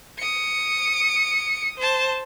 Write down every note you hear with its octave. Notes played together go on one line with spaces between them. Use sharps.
D#6 C#7
C5 A5